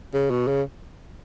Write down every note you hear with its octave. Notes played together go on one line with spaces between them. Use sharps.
C#3
B2
C#3